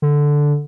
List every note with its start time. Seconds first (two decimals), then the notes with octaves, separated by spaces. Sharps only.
0.02 D3